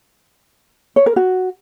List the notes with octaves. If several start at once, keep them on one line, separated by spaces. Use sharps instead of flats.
C#5
A#4
F#4